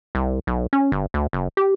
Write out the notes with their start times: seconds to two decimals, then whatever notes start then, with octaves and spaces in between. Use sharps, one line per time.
0.15 C2
0.47 B1
0.73 C#4
0.92 G1
1.14 D2
1.33 F#1
1.57 G4